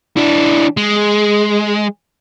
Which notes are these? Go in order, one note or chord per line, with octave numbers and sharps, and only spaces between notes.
E3 D4
G#3